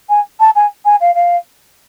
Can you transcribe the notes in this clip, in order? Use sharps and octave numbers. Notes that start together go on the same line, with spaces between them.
G#5
A5
G#5
G#5
F5
F5